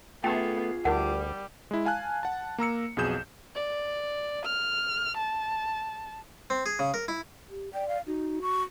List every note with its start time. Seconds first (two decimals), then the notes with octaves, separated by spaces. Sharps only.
0.24 A3 B3 F4 G#4 G5 A#5
0.85 D2 G3 D#4 A#4 F#5
1.71 G#3 E4
1.86 F5 G#5 A5 F#6
2.23 F#5 A5
2.58 A#3 A#5 E6 C#7
2.97 B1 F2 B2 G#4 G6 E7
3.55 D5
4.45 F6
5.17 A5
6.50 C4
6.66 G#4
6.79 C#3
6.94 A#4
7.08 E4
7.50 G4
7.74 D5 G5
7.88 F5
8.07 D#4 F#4
8.42 C#6